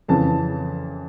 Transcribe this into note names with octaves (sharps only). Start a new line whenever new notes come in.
F2 C#3 E3 A5